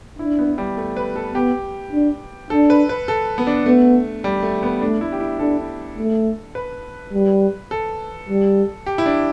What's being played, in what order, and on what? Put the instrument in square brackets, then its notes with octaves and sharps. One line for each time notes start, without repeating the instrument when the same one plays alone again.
[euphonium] D4 [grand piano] E4
[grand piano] B3
G3
A3
B4
A4
[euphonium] B3 [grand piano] G4
[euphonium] D4
[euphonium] D4 [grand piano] A4
[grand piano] B4
B4
A4
B3
D4
[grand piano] A3 [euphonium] B3
[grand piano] G3
A3
B3
[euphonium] A3 [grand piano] D4
[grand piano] E4
G4
E4
[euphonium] D4 [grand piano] A4
[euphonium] A3
[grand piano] B4
[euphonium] G3
[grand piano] A4
[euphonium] G3
[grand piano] G4
E4
D4